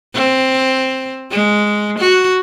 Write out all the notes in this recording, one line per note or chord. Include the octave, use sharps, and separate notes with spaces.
C4
G#3
F#4